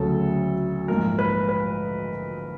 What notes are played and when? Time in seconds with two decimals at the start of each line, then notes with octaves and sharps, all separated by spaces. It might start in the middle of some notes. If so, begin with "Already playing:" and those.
Already playing: D2 C#3 F#3 A4
0.88 A#1 G#2 F3 A#4
1.19 B4
1.49 B4